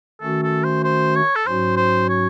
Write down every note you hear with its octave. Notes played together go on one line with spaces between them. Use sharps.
D#3 A3 C#4 F#4 A4
A4
C5
C5
C#5
A4
G#2 F#3 C#4 F#4 C5
C5
C#5